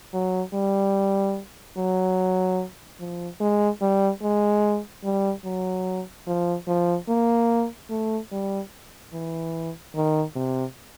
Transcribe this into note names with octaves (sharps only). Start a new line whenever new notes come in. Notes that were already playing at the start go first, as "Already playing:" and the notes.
F#3
G3
F#3
F3
G#3
G3
G#3
G3
F#3
F3
F3
A#3
A3
G3
E3
D#3
C3